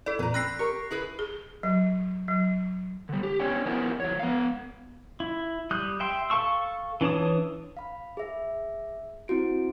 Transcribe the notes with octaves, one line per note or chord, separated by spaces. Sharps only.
E4 A4 D5
F2 A#2 B4 A#5
C4 B5 F#6 A#6 C7
G4 A#4 C#6
E4 G#4 B4
G#4
F#3
F#3
D3 G3
G4
B3 C#4 D4 C#5 G5 G#5
F3 B3 E4 A#4 C5 G#5
F3 C#5
B3 F5
E4
G3 D#6 F#6 G6
E5 G5 C6
A4 F5 A5 C#6 E6
E3 D4 C#5 A5 D#6
F5 B5
G#4 E5
C4 E4 F#4 D7